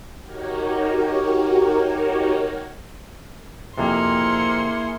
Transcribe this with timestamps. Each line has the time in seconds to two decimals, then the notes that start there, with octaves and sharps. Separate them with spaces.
0.20 D#4 F#4 G4 A#4 C#5
3.78 F2 C3 A#3 E4 G#4 C6 C#7